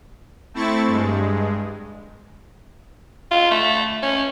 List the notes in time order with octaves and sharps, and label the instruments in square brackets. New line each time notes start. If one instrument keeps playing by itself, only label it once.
[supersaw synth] A3 C4 E4 C#6 A6
G2 G#3
[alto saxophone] F4
A3
C#4